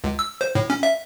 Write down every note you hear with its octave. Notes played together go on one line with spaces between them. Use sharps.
C#2
E6
C5
A2
C#4
E5